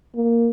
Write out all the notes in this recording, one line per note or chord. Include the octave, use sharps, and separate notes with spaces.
A#3